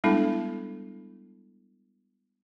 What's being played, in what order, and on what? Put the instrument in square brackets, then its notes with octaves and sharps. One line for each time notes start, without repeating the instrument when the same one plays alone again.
[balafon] G3 G#3 B3 D4 E4 A4